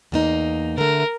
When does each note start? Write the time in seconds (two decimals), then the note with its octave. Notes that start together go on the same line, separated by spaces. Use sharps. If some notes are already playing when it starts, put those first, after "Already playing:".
0.12 E2 A#3 D#4
0.78 D3 A3 A#4